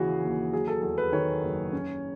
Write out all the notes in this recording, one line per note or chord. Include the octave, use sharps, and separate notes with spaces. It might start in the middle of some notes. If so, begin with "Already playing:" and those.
Already playing: D#2 C#3 E3 F#4 G#4
D#2
F#3 G#4
A4
E2 A4
B4
D#3 C#5
F#1
C#4